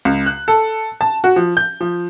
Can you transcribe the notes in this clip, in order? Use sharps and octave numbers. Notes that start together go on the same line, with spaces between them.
C#2
F#6
A4
A5
F#4
F3
G6
F3